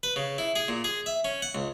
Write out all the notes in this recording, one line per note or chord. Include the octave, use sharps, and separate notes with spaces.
B4
C#3
E4
G#4
A#2
G#4
E5
C#4
F#5
C#2